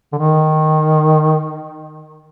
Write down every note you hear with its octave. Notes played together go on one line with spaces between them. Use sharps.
D3
D#3